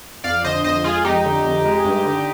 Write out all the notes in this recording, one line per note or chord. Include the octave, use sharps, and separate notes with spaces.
F2 D5 F5
D3 C5 D#5
F2 C5 D#5
G#3 F4 G#4
F2 D#4 G4
D3
F2
G#3
G2
D3